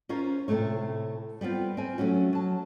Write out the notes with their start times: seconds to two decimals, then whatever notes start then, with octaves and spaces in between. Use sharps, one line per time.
0.09 C#4 F4 A#4 C5 C#5
0.48 A2 C3 E3 A3 C#5
1.41 G3 B3 C4 F4
1.77 C4 G#5
1.98 F#3 A3 C#4 F#4
2.33 F#3 A5